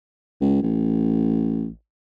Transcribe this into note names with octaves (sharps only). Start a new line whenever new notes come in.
C#2
A1